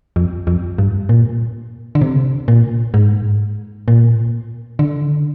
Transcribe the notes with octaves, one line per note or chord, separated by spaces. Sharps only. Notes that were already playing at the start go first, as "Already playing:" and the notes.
F2
F2
G2
A#2
D3
C3
A#2
G#2
A#2
D3